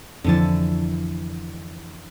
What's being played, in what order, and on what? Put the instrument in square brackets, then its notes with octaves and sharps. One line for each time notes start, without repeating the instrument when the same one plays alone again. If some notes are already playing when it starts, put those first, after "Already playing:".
[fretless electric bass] F2 F3 [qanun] D3 E3 A5